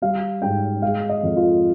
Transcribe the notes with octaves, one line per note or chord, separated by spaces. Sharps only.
G3 F5
G#2 G5
G#3 F5
D#5
F2
F4